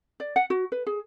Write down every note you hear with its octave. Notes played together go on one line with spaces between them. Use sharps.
D5
F#5
F#4
B4
G#4